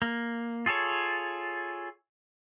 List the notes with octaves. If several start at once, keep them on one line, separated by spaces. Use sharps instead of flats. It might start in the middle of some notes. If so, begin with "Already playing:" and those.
A#3
F4 G#4 A4 C#5